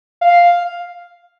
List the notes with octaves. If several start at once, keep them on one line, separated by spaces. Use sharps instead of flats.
F5